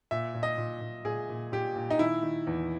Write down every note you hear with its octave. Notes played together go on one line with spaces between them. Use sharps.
A#2 E5
A#2
D#5
A#2
A#2
A#2 G#4
A#2
A#2 G4
A#2
D#4
D#3 E4
D#3
E2